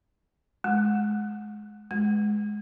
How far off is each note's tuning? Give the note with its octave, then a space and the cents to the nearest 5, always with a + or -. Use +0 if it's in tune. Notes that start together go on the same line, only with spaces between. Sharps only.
G#3 +20
G#3 +10